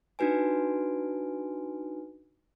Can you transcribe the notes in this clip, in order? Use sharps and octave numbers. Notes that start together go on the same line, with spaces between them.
D4 D#4 F#4 B4 G#5